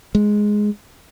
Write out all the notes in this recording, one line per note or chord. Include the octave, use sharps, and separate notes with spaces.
G#3